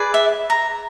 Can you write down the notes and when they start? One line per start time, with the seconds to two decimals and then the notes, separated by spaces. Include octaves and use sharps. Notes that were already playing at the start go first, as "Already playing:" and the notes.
Already playing: G#4 B4 D5
0.14 E5
0.50 A#5